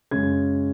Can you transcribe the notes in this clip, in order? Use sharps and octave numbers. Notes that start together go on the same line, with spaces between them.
F#2 C#3 G#3 C#4 G#6